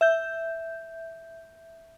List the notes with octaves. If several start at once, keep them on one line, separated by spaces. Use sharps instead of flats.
E5 G6